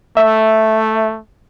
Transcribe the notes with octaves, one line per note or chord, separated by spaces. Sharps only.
A3 E5